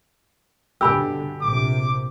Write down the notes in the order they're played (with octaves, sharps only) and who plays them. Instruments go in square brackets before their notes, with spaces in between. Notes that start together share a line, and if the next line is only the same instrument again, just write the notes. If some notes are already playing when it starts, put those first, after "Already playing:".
[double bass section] G2 B2 D3 [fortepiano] G4 [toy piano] G#5 B5 E6
[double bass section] A#1 C3 [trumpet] D6